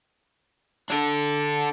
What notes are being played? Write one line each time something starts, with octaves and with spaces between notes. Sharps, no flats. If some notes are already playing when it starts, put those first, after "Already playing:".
D4 A4